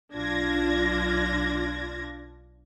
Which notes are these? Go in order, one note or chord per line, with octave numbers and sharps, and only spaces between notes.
B1 D4 F4 G#6 A#6